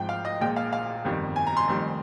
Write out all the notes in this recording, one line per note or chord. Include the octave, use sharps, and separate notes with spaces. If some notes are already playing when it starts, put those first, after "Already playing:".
Already playing: G#1 G#2 F3 G5
F5
D#5
A#1 A#2 G#3 G5
F5
F5
G1 F2 D#3 G3
G#5
A#5
C6
F1 F2 D#3 G3